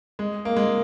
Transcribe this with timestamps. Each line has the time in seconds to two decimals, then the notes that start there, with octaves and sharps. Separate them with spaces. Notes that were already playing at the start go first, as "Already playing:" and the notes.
0.19 G#3
0.45 A#3
0.56 G#3